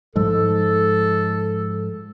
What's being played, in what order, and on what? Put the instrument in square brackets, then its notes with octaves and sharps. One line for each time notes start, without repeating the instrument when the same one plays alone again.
[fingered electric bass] G#2 F3 G#3 [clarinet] A4